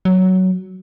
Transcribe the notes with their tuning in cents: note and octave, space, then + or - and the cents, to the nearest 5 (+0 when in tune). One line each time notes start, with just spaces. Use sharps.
F#3 +10